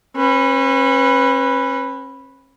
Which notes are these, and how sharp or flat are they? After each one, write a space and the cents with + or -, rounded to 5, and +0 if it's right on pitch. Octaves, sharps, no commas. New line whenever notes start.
C#4 -40 B4 +0